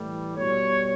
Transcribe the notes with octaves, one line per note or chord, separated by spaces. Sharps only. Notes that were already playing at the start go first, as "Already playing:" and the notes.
Already playing: A2 E3 G3
B2 G3 C#5